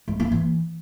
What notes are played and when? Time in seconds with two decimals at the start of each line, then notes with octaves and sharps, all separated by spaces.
0.08 G#3
0.20 A#3
0.32 E3